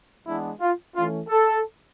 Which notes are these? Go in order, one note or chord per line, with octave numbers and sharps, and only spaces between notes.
E3 G#3 B3 D4 E4
F4
E3 A3 C#4 F4
A4